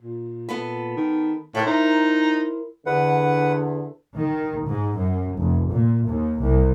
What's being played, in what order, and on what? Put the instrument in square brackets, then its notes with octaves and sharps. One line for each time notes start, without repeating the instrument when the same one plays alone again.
[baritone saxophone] A#2
[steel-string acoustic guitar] B3 A4 B4
[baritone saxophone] D#3
[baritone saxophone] A2 [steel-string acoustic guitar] E4 A#4 C5
[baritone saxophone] D#4
[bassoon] E2 [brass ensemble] D3 [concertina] B4 F#5
[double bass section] D#3
G#2
F#2
F1
A#2
D#2
C2